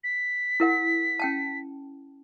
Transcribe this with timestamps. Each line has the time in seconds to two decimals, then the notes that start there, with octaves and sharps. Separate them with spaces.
0.04 B6
0.60 E4 A#4 F#5
1.20 C#4 G5 A5